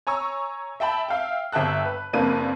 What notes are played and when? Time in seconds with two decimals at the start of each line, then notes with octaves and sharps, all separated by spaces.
0.07 C#5 G#5 A#5 C#6 E6
0.80 E5 G5 A5 B5
1.09 E5 F5 G5
1.52 G1 E5 G5 A5 F#6
1.85 B4
2.13 F#1 F2 A#3 D4 B4 D#7